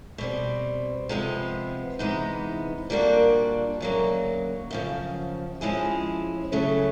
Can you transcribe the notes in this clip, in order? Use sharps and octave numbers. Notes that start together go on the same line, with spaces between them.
B2 G3 C4
C3 F3 G#3 B3
C3 E3 G#3 B3 D#4
A#2 G3 A#3 D4 F#4
D2 C#3 F#3 A#3
F#2 C#3 F3
F3 G#3 C#4 E4 G#4
C#3 F#3 A3 C#4